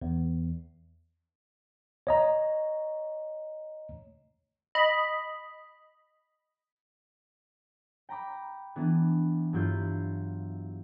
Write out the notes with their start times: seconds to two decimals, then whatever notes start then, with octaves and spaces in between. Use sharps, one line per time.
0.02 E2
2.07 C#5 D#5 A#5
4.75 D#5 B5
8.09 G5 A#5 B5 D6
8.76 E3 B3 D4
9.53 G2 F#3 E4 F4 G6